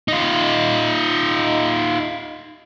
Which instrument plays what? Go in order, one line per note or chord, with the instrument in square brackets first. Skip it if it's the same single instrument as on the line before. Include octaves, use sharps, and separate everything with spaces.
[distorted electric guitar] D#4 F4